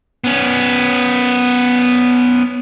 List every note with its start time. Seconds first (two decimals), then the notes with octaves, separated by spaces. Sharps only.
0.24 B3 C#4